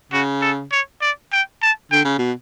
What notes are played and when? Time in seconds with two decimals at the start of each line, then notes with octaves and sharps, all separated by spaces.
0.12 C#3 F#4
0.41 A4
0.72 C#5
1.01 D5
1.32 G5
1.62 A5
1.92 D3 G5
2.05 C#3
2.19 B2